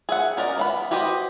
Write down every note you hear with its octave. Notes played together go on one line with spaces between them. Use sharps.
G#4 E5 F#5
C#4 A#4 D5 D#5
B3 F5 B5
F#4 G4 B4 C5 D#5